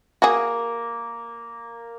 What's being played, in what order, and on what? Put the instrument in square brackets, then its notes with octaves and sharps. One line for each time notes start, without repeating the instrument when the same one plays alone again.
[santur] A#3 [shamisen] F#4 G#4